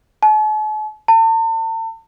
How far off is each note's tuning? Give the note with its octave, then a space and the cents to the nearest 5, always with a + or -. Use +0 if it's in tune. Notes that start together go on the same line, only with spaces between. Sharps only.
A5 -45
A5 +40